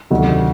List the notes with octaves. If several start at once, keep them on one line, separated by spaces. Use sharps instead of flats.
D2 C3 D#3 F#3 A3